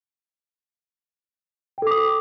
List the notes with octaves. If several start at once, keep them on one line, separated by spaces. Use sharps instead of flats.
A4 G5 D6 D#6